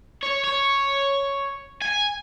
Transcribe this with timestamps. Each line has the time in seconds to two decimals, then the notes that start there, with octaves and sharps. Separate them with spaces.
0.23 C#5
0.44 C#5
1.82 G#5